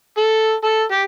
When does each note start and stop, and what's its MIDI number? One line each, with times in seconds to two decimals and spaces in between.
0.17 0.53 69
0.64 0.83 69
0.92 1.02 67